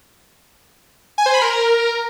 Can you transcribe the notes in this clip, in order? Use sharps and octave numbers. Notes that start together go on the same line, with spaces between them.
G#5
C5
B5
A#4